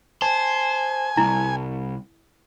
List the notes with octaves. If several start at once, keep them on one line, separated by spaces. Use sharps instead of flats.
C5 G#5 A5
C2 E4